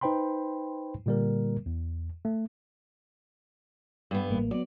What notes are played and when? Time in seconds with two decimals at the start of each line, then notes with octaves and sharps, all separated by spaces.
0.01 D#4 B4 C5 G5 B5 C6
1.06 A#2 D3 G3 A#3 A#4
1.66 E2
2.25 A3
4.11 G2 B3
4.31 A1 A#3
4.51 F#3 B3 D5